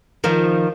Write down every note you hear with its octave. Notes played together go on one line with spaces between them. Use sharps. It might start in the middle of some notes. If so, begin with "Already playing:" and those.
D#3 F3